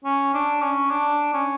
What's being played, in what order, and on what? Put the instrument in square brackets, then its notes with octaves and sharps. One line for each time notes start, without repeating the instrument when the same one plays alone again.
[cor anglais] C#4
D4
C#4
D4
C#4